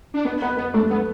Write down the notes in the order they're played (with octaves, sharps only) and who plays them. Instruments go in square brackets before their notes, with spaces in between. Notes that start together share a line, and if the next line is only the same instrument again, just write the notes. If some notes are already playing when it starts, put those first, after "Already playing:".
[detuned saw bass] D4
[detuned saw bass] B3 [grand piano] B4
[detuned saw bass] B3 [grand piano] B4
[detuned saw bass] B3 [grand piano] B4
[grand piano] A3 [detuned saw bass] D4
[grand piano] A3 [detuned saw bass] B3